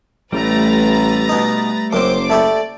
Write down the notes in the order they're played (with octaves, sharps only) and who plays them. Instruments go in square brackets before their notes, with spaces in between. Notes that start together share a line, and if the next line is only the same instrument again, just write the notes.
[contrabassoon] A1 [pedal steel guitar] G3 A3 [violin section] B4 A#5 A6
[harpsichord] B2 D#4
[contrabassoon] F#1 [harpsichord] F#2 C4 [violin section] C5 D6
[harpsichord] A3 E4 G4 [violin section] D5